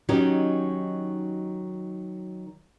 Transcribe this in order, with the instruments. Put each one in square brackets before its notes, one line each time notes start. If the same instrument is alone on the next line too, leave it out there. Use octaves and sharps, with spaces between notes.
[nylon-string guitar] D#3 F#3 C#4 D#4 F#4 G4